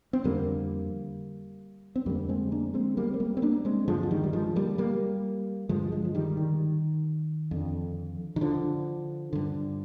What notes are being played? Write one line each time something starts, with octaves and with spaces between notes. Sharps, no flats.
C4
F2 D3 G3 A#3
C4
F2 D3 G3 A#3
G#3 C4
A#3 D4
G#3 C4
G3 A#3
C4
G3 A#3
C4
A#3 D4
G#3 C4
G2 D3 F3 G#3
F3
D#3 G3
G3
F3 G#3
G3 A#3
G3 A#3
G2 D3 F3 G#3
F3 G#3
F3
D#3 G3
D#3
F2 D3
D#3
D3 F3
G2 D3